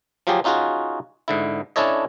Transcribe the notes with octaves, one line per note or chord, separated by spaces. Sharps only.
F3 F#3 F4 G4 G#4
C#4 D#4 F4 F#4 G#4
G#2 D3 E4
C#4 D4 E4 A4 C#5 D#5